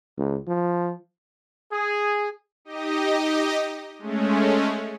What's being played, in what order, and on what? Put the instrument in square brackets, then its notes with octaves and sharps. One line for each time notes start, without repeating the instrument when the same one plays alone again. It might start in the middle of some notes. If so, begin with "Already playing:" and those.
[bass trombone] C#2
F3
[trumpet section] G#4
[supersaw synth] D#4 G4 D#5
G#3 A3 C#4